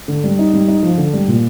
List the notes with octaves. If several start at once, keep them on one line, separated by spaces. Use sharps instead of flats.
D3
G3
D#4
G3
D#4
F3
D3
G3
A#2